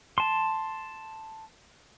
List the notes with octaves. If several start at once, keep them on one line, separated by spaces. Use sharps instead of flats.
A5 C6